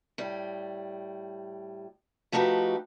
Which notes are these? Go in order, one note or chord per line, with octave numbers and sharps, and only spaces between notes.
A2 G3
F3 A3 D#4 F#4 G4 B4